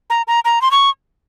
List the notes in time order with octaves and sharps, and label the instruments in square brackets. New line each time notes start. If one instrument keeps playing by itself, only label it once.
[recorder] A#5
A#5
A#5
C6
C#6